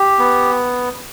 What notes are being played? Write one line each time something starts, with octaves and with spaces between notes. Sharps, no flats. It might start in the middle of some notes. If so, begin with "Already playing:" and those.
Already playing: G4
B3